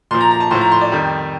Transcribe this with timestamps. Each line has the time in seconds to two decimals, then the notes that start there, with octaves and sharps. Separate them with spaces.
0.11 A#2 F3 C6
0.21 A#5
0.31 A#5
0.40 A5
0.50 A2 F3 C6
0.61 A#5
0.72 C6
0.81 D5
0.92 F2 D#3 G3